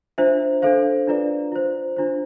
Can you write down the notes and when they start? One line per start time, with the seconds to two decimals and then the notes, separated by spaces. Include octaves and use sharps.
0.18 D4 F4 C5 E5
0.62 D4 A4 C5 F5
1.07 D4 F4 B4 D5
1.52 F4 C5
1.96 D4 F4 C5